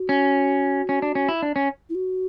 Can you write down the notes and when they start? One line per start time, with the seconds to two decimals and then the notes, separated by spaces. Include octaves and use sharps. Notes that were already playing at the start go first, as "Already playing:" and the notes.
Already playing: F#4
0.09 C#4
0.89 C#4
1.02 D4
1.15 C#4
1.29 E4
1.42 D4
1.56 C#4
1.89 E4
1.95 F#4